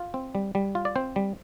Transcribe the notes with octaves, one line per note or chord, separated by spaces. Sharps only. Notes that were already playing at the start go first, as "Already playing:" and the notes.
Already playing: F4
C4
G3
G3
F4
D5
C4 C5
G3